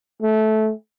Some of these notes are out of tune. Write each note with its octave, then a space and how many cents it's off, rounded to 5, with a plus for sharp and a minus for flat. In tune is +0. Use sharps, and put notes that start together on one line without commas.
A3 -15